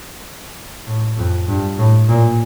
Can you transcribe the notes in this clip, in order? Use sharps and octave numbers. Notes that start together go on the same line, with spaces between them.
A2
F2
G2
A2
A#2